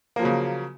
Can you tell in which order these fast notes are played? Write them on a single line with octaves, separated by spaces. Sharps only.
A#3 F3 F#3 C#3